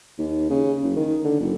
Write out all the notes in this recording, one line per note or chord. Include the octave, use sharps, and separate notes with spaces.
D#2
C#3
F#1
D#3
D3
F#1